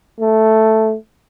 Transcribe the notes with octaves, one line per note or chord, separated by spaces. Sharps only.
A3